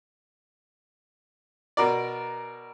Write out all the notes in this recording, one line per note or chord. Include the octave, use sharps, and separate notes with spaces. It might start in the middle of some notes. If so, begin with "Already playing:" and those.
B2 A#4 D5